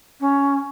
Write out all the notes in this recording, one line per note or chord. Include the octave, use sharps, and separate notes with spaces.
C#4